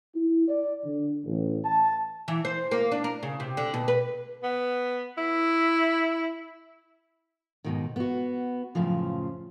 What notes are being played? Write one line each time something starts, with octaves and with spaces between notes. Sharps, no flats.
E4
D5
D3
A1
A5
E3
C5
A#3
D4
A#4
C#3
C3
D3
B2
B4
B3
E4
G#2 B2 D#3
B3 F#4
F#2 A2 C#3 F3